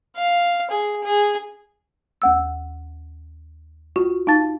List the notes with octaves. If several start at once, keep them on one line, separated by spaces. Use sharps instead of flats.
F5
G#4
G#4
D#2 F#5 E6
F4 F#4 C#6
D#4 F5 A5 A6